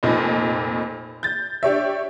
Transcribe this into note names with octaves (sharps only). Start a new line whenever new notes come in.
F1 F2 A#2 D#4
G6 A6
D4 G4 C#5 E5